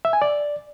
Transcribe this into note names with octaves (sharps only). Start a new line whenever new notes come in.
E5
G#5
D5